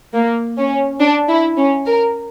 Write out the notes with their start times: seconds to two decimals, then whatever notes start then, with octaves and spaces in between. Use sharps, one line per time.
0.14 A#3
0.57 C#4
1.00 D4
1.28 E4
1.57 C#4
1.85 A#4